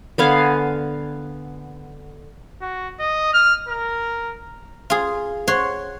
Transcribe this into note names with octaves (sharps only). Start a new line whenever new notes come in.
D3 B3 F5 G#5
F#4
D#5
F6
A#4
F4 G#4
C#5 F#5 C6